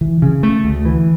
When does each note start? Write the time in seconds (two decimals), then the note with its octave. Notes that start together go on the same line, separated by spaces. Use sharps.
0.01 E3
0.22 C#3
0.43 A3
0.64 D2
0.85 E3